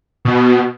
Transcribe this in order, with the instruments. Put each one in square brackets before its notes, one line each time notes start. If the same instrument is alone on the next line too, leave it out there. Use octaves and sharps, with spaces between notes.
[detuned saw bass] B2